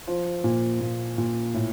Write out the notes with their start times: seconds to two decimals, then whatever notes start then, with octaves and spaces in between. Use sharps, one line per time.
0.07 F3 C5
0.44 A#2
0.81 A#2
1.18 A#2
1.54 A2